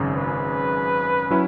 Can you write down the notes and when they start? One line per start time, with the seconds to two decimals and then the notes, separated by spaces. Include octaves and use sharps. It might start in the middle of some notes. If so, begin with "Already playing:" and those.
Already playing: G#1 F#2 C#3
0.16 B4
1.30 F#3 C#4 E4